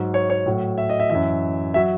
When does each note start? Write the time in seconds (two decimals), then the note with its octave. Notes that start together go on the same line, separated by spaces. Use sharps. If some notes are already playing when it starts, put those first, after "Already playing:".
Already playing: G#2 F#3
0.14 C#5
0.30 C#5
0.46 A2 F#3
0.78 E5
0.89 D#5
1.00 E5
1.10 F#2 E3 E5
1.74 F#3 E5